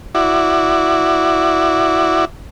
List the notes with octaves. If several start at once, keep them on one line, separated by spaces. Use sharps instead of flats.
E4 F#4 D5